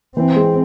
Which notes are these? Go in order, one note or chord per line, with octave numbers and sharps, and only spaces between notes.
E3 C4
G#3